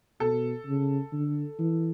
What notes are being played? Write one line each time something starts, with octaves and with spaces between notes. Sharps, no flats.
B2 A4
C#3
D3
E3